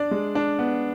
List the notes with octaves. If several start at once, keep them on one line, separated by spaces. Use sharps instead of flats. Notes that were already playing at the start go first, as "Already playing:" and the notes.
Already playing: D4 D5
G#3
D4
B3